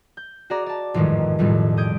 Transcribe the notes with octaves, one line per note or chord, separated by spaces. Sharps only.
G6
F#4 G#4 D5 A#5
D5 A5
A1 F2 G#2 D#3 G3 G#3
B1 F2 A2 G3 G#3
D#6 G6 G#6 D7